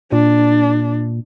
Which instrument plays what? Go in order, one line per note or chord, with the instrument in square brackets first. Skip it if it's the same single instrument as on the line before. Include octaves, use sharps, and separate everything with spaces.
[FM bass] A#2 [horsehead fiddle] D4